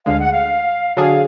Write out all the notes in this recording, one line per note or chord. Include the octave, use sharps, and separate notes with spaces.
D2 D3 G#3 F5
F#5
F5
D3 F#3 D4 G#4 F5